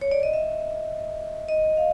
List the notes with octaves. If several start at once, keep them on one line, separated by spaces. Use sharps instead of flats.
C#5
D5
D#5
E5
D#5
F5